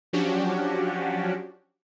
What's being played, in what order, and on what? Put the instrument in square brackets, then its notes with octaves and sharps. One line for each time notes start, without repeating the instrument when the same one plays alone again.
[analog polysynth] F3 F#3 C#4 D4 F#4 G4